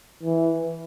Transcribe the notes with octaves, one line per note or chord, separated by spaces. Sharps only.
E3